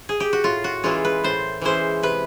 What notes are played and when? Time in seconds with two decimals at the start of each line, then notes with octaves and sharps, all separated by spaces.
0.09 G#4
0.20 G4
0.33 F#4
0.44 A2 F4
0.64 F#4
0.83 E3 G#3 C#4 E4 F4
1.05 B4
1.24 A2 C5
1.61 E3 G#3 C#4 E4 C5
2.03 C3 B4